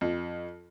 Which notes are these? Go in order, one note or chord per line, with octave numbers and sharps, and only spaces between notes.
F2